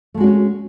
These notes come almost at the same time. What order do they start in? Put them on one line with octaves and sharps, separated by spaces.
A3 G#3 F#4 D4 C#4